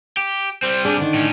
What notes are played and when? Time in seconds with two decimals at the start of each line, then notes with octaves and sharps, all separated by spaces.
0.17 G4
0.63 G3 C4 C5
0.85 D4 G#4
0.97 D3 D#3
1.14 A2 C#4